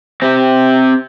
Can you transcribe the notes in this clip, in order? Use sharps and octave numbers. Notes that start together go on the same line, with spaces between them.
C4 G4